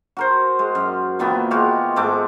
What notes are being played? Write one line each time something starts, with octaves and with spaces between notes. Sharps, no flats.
F#4 A#4 C5
G#3
F#2
A#2 D#3 E3 B3
G#3 F#4 G4 F5
G#2 G#3 A3 D6